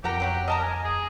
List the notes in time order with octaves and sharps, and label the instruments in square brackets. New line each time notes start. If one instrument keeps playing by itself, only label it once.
[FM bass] F2 [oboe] G4 [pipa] A#4 F#5 A#5
[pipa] E3 F#3 F#5
[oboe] A#4 [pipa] D#5 A5 A#5
[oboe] G#5
G#4